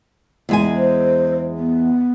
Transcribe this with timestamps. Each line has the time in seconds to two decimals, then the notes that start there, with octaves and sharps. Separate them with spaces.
0.49 E2 G#3 G#5
0.75 C5
1.57 B3